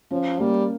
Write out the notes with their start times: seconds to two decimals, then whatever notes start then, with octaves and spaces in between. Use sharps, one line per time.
0.11 F3 C#4
0.39 G3 A#3